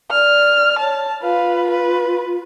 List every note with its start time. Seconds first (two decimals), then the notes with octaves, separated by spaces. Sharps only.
0.11 D5 F6
0.80 C#5 A5
1.23 F4 B4 F5
1.70 B4